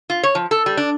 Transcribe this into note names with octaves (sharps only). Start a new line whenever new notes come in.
F4
C#5
F3
A4
G3
D4